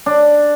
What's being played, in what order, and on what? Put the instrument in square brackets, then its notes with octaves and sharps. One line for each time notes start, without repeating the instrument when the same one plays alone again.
[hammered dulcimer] D4